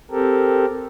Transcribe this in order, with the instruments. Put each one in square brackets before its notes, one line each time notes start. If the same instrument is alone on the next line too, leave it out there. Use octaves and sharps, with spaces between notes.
[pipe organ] C4 G4 A4 A#4